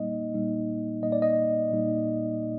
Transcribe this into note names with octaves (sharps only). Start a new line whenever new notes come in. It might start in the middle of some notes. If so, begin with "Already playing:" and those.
Already playing: A#2 G3 A#3 D#4 D#5
A#2 G3 A#3 D#4
A#2 G3 A#3 D#4 D#5
D5
D#5
A#2 G3 A#3 D#4